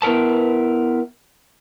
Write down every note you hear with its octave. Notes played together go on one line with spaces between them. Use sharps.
B3 E4 A#4 B4 A5